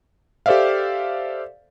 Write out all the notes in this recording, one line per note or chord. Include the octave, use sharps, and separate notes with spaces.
G4 A4 C5 D5 E5 F5